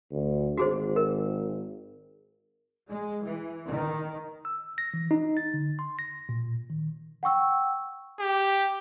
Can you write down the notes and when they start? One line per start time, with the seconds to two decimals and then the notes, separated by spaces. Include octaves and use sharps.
0.11 D2
0.58 G#1 F#4 G#4 C5
0.96 A#4
2.89 G#3
3.24 E3
3.70 D#3
4.45 E6
4.78 A#6
4.94 E3
5.11 D#4
5.37 A6
5.54 D3
5.79 C6
5.99 A#6
6.29 A#2
6.70 D#3
7.23 F#5 G5 C#6 E6
8.20 G4